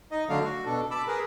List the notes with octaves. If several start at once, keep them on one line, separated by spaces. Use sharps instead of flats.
D#4 D#5
D3 F#3 A3 D4 F5
F#4
B2 D4 A4
A5 B5 D6 E6
G#4 A#4 B4